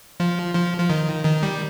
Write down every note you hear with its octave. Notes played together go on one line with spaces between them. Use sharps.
F3
F3
F3
D#3
D#3
G3